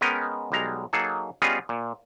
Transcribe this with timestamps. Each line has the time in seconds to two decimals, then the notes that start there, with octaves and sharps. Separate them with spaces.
0.01 G#3 B3 C#4 A#4 D#5 G5
0.52 B1 G3 G#3 A#5
0.93 F#3 A#3 D#4 G#4 A4
1.42 G3 B3 C#4 F4 G#4 D#5
1.69 A#2